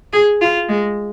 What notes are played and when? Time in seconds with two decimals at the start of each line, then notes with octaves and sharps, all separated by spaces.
0.13 G#4
0.41 F4
0.69 G#3